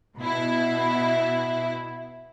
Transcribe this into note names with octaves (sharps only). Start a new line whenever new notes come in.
B2 E4